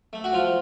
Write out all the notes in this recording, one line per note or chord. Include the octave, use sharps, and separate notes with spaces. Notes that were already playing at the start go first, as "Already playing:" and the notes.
A3
F#4
F3 F4